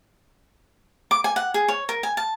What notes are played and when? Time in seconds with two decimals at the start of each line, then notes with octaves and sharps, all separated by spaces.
1.11 D6
1.24 G#5
1.36 F#5
1.54 G#4
1.68 C#5
1.89 A#4
2.03 G#5
2.17 A5